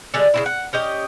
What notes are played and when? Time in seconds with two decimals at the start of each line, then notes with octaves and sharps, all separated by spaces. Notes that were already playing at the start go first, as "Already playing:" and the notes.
0.14 D3 G3 G#3
0.34 C#3 E3 E4
0.46 F#5
0.73 C#4 G4 D#5